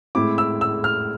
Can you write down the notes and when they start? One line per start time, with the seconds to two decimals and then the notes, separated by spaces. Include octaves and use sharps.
0.15 A2 G#3 C4 E4 D6
0.38 E6
0.61 E6
0.84 F6